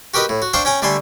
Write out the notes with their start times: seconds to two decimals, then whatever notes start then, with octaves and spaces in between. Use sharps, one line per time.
0.14 F#4 G4 A#4 B4 D#5
0.29 A2
0.42 F#4
0.53 D4 C5 F5 G5 C#6
0.65 C#4 G5 G#5 A#5
0.82 D3 G3 A3 G#5 C6